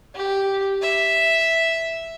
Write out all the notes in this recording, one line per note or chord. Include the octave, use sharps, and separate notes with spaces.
G4
E5